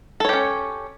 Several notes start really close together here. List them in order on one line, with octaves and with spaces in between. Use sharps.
A4 C#5 G4 C#4